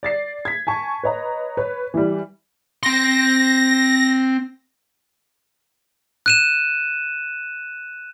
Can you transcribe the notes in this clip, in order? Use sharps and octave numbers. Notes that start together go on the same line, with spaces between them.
D5 A6 C7
G#6 B6
G#5 A5 C#6
B4 C#5 D#5 A#5
B4 C#5
E3 G3
C4 C6 A#6
F#6 D#7 E7